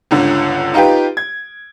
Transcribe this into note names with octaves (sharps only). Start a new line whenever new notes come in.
G1 C#2 D3
D#4 F4 G4 B4 G5
G#6